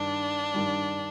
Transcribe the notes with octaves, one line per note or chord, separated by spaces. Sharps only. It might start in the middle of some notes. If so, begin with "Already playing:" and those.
Already playing: G2 D#3 G3 D4
G2 D#3 G3